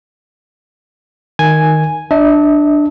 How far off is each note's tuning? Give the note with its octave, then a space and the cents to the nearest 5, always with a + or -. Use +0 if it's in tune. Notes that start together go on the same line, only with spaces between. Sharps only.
D#3 +0 G#5 +0
D4 +10 E5 -40